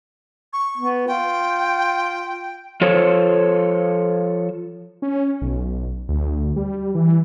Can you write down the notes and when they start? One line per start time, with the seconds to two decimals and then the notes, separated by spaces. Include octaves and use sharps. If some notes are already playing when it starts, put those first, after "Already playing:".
0.53 C#6
0.78 B3
1.08 F4 G5
2.81 F3 F4 A4 C5 C#5
5.02 C#4
5.42 B1
6.09 D2
6.56 G3
6.95 E3